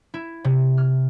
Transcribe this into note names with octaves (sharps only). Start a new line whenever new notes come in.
E4
C3
F6